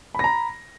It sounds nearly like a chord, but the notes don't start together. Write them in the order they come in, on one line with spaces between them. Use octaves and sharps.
B5 A#6 A#5